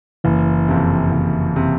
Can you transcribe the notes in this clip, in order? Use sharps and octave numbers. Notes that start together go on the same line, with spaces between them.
F#1 E3
F2 C3
F#1
C3